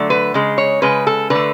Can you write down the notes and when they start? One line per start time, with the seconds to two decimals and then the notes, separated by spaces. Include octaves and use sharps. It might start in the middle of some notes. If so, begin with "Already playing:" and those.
Already playing: D3 F#3 A3
0.10 B4
0.34 C#3 G#3
0.58 C#5
0.82 C#3 G#3 B4
1.07 A4
1.30 D3 B4
1.35 A3